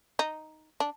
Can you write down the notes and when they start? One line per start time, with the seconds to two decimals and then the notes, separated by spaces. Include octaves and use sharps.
0.19 D#4
0.80 D4